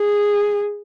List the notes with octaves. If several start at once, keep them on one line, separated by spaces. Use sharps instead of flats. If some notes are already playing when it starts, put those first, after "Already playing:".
Already playing: G#4